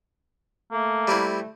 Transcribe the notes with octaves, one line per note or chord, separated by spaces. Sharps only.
A3 A#3
G3 C4 E4